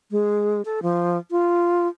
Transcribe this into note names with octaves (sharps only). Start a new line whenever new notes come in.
G#3
A4
F3
F4